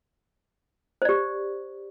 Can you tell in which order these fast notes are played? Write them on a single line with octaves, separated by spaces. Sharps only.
C5 D5 G4